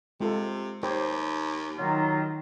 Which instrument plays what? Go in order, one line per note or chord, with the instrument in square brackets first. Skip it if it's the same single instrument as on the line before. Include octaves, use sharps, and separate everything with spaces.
[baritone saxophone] C3 [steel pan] G#3 F4 A4
[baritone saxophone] D#2 [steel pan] G4 C5 C#5
[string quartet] D#3 [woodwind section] F#3 F4